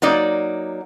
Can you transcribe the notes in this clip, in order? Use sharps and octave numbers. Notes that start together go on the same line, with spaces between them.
F#3 A#3 D#4 D5